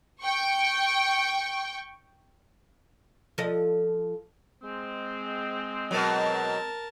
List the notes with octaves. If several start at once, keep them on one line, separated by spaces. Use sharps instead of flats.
G5 C#6
F3 A4 D#5
G#3 C4
B2 F#3 A#4 A5